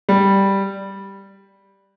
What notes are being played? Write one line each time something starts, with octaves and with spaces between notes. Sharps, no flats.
G3